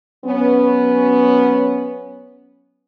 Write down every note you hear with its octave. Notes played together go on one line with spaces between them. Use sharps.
F#3 B3 C#4